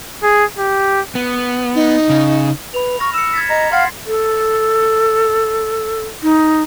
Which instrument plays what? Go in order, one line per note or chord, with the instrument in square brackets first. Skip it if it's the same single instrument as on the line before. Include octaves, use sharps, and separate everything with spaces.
[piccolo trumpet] G#4
G4
[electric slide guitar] B3
[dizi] D#4
[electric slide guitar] C#3
[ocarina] B4 [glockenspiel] B5 F7
[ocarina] C#6 [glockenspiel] F6 A#6
[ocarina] E6 [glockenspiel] C#7 E7
[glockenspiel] G#6 A6 B6
[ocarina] D#5 [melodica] A#5
[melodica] F5 [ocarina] F#5 [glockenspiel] C6 A6 C7
[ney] A4
D#4